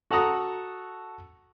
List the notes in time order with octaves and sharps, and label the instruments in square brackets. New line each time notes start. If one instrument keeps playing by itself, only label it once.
[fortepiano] F#4 A4 F#5 A#5 D#6